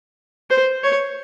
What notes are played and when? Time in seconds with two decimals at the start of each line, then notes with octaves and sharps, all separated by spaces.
0.50 C5
0.84 C#5